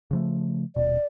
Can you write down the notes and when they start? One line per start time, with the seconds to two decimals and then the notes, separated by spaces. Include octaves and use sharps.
0.11 C#3 F3 A3
0.76 D#1 B2 D5